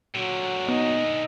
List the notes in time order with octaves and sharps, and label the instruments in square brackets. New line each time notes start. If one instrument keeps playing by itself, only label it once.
[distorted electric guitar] A#2 D3 [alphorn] F#3
[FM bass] B3 [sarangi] D#4